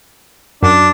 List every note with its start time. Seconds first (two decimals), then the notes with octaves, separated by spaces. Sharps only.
0.63 F#2 D4